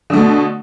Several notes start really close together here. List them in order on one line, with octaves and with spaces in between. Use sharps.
D3 A3 B2